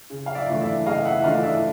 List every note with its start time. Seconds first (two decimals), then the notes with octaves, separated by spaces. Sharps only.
0.10 C#3
0.26 F5
0.35 D5 E5
0.48 E3 A3 D4 F4
0.61 D5 E5
0.86 C#3 D#5 F5
1.05 E5 F#5
1.18 E5
1.24 E3 A3 D4 F4 D#5 F5
1.43 D5 E5